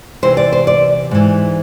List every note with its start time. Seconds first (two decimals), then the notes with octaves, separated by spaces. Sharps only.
0.22 E2 C3 E3 C5
0.37 D5
0.52 C5
0.67 D5
1.11 G#2 E3